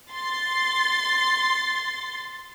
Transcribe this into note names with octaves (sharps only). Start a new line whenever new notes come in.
C6 A6